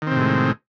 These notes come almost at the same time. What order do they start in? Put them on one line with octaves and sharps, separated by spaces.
D#3 C4 C3 A2 G#3